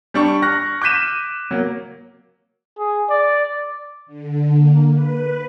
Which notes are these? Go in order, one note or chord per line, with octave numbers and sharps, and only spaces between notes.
G3 D4 C#6
C#6 F6 F#6 A#6
D6 F#6 G6 B6 D#7 E7
F#3 A#3
G#4
D5
D3
A#3
B4